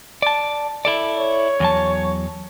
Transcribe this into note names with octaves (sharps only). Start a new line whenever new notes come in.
D5 A5
E4 A4 D5
C#5
E2 F#3 A5